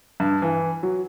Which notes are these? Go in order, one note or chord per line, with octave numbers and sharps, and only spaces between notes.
G2
E3
F#3